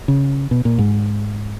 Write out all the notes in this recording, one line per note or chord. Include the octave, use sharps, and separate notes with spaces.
C#3
B2
A#2
G#2